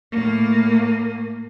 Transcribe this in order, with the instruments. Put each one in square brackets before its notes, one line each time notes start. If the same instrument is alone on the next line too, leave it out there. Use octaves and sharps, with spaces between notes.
[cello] A2 A#3